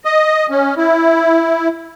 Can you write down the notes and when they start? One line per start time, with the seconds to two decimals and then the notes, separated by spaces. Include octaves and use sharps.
0.05 D#5
0.50 C#4
0.77 E4